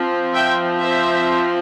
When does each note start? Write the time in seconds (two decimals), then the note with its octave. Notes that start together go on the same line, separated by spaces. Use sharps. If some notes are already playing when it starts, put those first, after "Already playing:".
Already playing: F3 C4
0.34 E5 G5
0.79 C5 E5